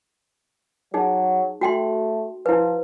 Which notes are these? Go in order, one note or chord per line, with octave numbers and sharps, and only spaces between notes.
F#3 D#4 G#4
A3 F#4 G5 C6
F3 E4 B4